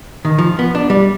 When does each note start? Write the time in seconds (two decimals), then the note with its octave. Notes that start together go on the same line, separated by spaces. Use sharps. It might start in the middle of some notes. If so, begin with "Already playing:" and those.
0.25 D#3
0.38 F3
0.59 B3
0.75 D4
0.90 G3